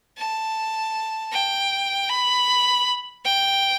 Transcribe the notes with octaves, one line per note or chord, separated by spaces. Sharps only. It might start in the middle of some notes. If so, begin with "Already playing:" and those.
A5
G5
B5
G5